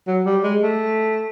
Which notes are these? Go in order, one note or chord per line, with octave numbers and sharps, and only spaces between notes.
F#3
G3
G#3
A3